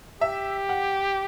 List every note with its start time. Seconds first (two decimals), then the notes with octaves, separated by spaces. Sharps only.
0.21 G4 E5
0.69 F#5